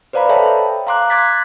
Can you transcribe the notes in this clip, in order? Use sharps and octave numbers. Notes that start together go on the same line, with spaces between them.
B4 C5 D5 F5 A#5 B5
A4 C#5 E5 G5 A5 B5
F5 A#5 C6 D6 F#6
C6 D6 F#6 G#6 A6 B6